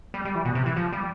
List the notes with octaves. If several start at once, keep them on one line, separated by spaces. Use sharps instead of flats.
G3
G3
E3
B2
C3
E3
F3
G3